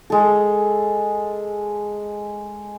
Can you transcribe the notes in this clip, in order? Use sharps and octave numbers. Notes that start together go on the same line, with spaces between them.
G#3 A4